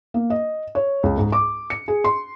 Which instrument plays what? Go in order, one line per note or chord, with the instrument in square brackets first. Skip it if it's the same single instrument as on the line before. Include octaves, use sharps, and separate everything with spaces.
[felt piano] A#3
D#5
C#5
C#2
G#2
D6
C#7
G#4
C6